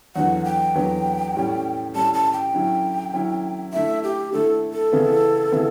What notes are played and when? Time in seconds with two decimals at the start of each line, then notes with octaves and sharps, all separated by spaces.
0.15 E2 D3 F#3 B3 F#5
0.45 G5
0.75 E2 D3 F#3 B3
1.34 A2 G3 C#4
1.94 A2 G3 C#4 A5
2.14 A5
2.33 G5
2.53 D3 F#3 C#4 E4
3.13 D3 F#3 C#4 E4
3.73 D3 A3 E4 E5
4.03 G4
4.33 D3 A3 E4 A4
4.73 A4
4.92 C#3 E3 B3 E4
5.52 C#3 E3 B3 E4